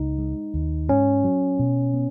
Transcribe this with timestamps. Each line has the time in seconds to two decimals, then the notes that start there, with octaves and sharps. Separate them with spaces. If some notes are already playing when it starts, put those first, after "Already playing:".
Already playing: C#2 D#4
0.18 G#3
0.54 D#2
0.89 G#2 C#4
1.24 F#3
1.59 B2
1.94 B3